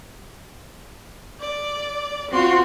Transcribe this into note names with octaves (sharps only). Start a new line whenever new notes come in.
D5
C4 F4 F#4 C6